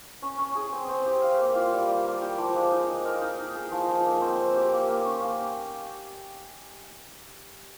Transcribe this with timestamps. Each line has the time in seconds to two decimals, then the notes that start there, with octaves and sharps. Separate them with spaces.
0.22 C#4
0.38 C#4
0.55 G#4
0.72 C4
0.89 C4
1.06 G4
1.22 F5
1.38 A#3
1.55 F4
1.72 G3
1.88 G3
2.05 A#3
2.22 G4
2.38 F3
2.55 G#3
2.71 D#4
2.88 D#4
3.05 A#4
3.21 D#4
3.38 D#4
3.55 G#4
3.72 F3
3.89 F3
4.05 A#3
4.21 C4
4.38 C4
4.55 G4
4.72 A#3
4.88 A#3
5.05 C#4
5.22 A#3